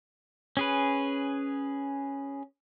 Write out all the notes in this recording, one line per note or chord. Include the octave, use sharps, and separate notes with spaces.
C#4 G#4 B4